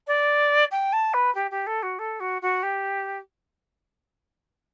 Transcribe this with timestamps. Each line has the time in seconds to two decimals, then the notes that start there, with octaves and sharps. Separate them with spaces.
0.07 D5
0.71 G5
0.93 A5
1.14 B4
1.35 G4
1.51 G4
1.67 A4
1.83 F#4
1.99 A4
2.20 F#4
2.42 F#4
2.63 G4